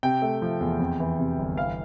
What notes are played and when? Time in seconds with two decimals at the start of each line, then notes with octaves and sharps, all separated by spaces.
0.03 C3 G5
0.22 A3
0.42 F3
0.61 E2
0.80 F2
1.00 E3
1.19 C3
1.38 G1
1.57 E3 F5